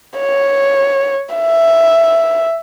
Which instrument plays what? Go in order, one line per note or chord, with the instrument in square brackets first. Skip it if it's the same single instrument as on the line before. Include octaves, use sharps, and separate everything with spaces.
[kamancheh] C#5
E5